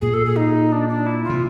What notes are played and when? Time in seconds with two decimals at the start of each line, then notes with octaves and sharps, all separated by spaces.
0.01 A#2 G#4
0.14 A4
0.25 G#4
0.36 D#4
0.72 D4
0.89 D4
1.06 E4
1.24 F4
1.30 C3